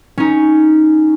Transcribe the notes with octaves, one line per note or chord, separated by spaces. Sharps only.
C#4 D#4